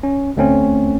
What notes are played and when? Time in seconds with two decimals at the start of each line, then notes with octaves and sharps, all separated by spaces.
0.03 C#4
0.37 D2 A3 C4 C#4